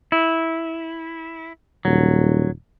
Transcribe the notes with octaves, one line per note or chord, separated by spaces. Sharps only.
E4
D#1 F#3